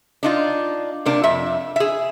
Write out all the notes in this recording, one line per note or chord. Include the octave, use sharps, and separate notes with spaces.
D4 D#4 F4
C3 A#3 D4
F2 E5
G#4 E5